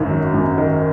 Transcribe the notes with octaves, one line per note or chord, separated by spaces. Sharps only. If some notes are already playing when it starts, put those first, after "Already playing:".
Already playing: G#1 F#2 D#3
F#3
F#2
D#3